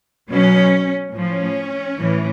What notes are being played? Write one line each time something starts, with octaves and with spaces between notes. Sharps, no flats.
B2 F#3 C#4
A2 F3 C#4
A2 E3